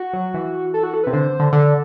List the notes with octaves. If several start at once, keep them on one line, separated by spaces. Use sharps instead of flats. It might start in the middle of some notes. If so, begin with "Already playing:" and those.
Already playing: F#4
F#3
E3
A4
F#4
A4
C3 B4
D3 C5
D3
D3 A4